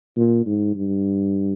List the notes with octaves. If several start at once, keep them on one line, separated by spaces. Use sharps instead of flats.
A#2
G#2
G2